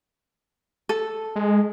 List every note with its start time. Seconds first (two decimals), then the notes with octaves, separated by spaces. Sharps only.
0.89 A4
1.36 G#3